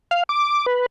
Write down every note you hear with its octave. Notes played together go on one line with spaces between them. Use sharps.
F5
D6
B4